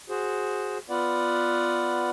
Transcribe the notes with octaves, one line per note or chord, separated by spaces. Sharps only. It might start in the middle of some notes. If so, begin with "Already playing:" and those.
F#4 G#4 C5
B3 F4 B4 D5 F#5